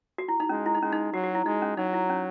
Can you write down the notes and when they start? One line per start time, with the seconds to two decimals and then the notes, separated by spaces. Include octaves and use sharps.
0.18 F#4
0.28 E4
0.40 D#4
0.49 G#3 C#4
0.66 E4
0.75 D#4
0.81 G#3 C#4
0.92 D#4
1.13 F#3 F#4
1.24 F#4
1.35 E4
1.45 G#3 D#4
1.62 C#4
1.77 F#3 D#4
1.93 E4
2.09 C#4